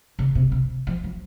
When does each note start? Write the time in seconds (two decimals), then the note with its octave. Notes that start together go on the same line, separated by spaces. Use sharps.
0.19 C#3
0.35 C3
0.52 C3
0.87 F3
1.04 F#3